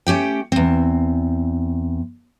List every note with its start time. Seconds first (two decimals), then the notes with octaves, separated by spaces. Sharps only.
0.07 A3 C#4 G4 G5
0.52 E2 C4